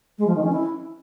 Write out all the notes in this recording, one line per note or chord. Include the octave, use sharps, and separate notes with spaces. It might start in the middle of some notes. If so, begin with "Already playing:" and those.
G#3
F3
D#3
C#4
E4